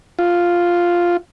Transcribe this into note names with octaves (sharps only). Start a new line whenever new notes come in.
F4